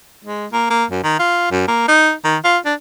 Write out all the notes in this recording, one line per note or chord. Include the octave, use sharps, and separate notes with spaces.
G#3
A#3
A#3
F#2
D#3
F4
F#2
A#3
D#4
D#3
F4
D4